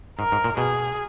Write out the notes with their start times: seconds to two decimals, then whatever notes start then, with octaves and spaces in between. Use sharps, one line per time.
0.19 G#2 A#4
0.32 G#2
0.44 A#2
0.57 B2 G#4